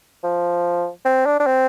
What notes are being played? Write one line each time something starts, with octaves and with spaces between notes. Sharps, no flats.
F3
C4
D4
D4
C4